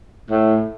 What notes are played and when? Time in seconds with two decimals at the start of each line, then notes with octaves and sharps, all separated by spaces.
0.30 A2